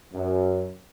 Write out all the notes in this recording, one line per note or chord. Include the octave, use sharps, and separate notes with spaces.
F#2